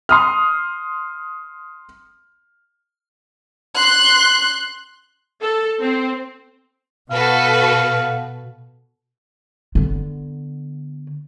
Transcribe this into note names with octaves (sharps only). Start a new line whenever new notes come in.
C6 D#6 F6
C6 F#6
A4
C4
B2 F#4 A4 B4 F5
D3 B3